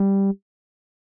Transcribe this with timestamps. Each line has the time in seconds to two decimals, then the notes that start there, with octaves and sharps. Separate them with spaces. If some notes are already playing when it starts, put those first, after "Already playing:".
Already playing: G3